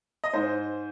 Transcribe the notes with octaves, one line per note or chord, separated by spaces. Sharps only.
D#5
G#2 C5